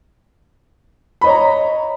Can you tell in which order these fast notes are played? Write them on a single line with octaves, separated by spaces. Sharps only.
B5 D#5 C#5 A#5